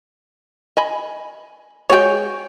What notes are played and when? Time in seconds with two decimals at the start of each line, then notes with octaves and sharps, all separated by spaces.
0.77 D#5 G#5 B5
1.90 G#3 F#4 G#4 C#5 G5